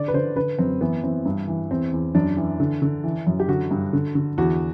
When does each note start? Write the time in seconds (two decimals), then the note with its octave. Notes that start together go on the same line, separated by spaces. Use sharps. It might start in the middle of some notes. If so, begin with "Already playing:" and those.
Already playing: D3 D5
0.08 B4
0.14 D3 C5
0.36 D3 B4
0.58 F#2 C4
0.81 E3 B3
1.03 E3 C4
1.26 G2
1.48 E3
1.70 E2 C4
1.92 E2
2.15 F#2 D4
2.37 E3
2.60 D3
2.82 D3
3.04 E3
3.27 F#2
3.40 G4
3.48 D3 F#4
3.71 G2
3.93 D3
4.15 D3
4.38 E2 F#4